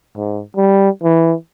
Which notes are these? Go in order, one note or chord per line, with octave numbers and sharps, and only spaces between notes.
G#2
G3
E3